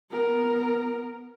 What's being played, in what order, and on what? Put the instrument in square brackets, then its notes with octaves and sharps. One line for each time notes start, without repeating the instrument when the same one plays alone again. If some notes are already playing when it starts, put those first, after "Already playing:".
[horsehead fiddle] B3 A#4